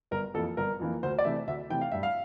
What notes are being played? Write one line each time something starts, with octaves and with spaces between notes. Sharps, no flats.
G1 A#4
F2 E3 A#3 A4
G1 A#4
F2 E3 A#3
D2 C5
D5
C3 E3 A3 E5
D2 E5
C3 E3 A3 G5
F5
G2 E5
F5